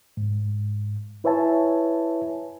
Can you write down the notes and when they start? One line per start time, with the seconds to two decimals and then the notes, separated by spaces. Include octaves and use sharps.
0.17 G#2
1.24 E4 B4 C#5 E5 G#5 A5